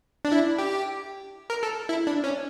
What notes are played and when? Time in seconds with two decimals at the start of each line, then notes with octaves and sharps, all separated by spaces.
0.25 D4
0.32 E4
0.59 G4
1.50 A#4
1.63 A4
1.89 E4
2.07 D4
2.24 C#4